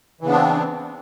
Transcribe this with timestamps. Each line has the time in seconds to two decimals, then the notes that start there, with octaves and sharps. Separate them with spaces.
0.21 E3
0.24 C#3
0.27 B3
0.29 D4
0.32 C4